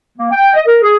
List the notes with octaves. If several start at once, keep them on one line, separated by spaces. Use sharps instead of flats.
A#3
G5
D#5
A#4
G#4